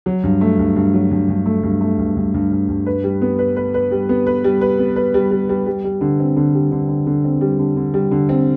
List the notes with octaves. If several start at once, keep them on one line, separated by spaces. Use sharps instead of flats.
F#3
G2
A3
G2
G2
F#3
G2
G2
A3
G2
A3
G2
G2
G2
G2
G2
B4
G3
B3
B4
B4
B4
G3
B3
B4
G3
B4
B3
B4
G3
G3
G3
G3
G3
D3
C4
D3
G3
D3
D3
D3
C4
G3
D3
D3
G3
D3
C4